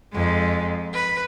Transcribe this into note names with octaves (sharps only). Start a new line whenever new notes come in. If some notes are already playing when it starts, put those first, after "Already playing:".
F2 G#3
B4